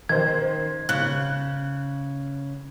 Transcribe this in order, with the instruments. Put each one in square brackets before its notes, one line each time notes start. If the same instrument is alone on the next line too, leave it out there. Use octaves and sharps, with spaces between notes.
[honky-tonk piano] D#3 C5 [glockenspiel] G#6
[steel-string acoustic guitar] C#3 [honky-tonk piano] F#6